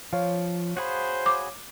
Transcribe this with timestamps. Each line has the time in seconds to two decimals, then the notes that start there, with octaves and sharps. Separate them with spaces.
0.13 F3 C#5 F5
0.77 F#4 G#4 C5 B5
1.26 D6